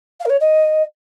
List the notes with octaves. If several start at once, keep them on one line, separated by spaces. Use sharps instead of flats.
F5
A#4
C#5
D#5